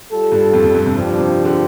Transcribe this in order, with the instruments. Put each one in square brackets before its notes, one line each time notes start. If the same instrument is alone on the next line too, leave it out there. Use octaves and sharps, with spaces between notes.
[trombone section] G3 F4 A4
[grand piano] G2
F2
F2
G2
C3
[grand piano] G2 [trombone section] F3 D4 G4
[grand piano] C3
D3